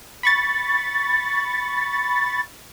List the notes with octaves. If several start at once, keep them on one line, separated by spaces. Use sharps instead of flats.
B5 C#6 A6